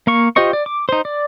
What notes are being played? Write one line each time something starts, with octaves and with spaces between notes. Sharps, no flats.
A#3 F5 C#6
F4 G4 C5 D#5 C#6
D5
D6
D#4 C5
D5